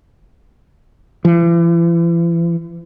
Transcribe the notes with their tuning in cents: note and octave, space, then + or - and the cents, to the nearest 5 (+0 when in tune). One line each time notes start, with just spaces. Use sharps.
E3 +40